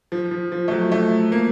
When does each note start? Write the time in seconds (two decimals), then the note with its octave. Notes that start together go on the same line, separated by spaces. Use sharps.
0.12 F3
0.31 F3
0.52 F3
0.68 A3
0.71 F#3
0.92 A3
1.32 A#3